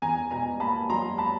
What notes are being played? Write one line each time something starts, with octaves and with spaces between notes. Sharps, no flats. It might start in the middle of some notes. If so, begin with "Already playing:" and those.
E2 G#5 A#5
B2 G#5 A#5
A#3 A5 B5
F#3 A#5 C6
A5 B5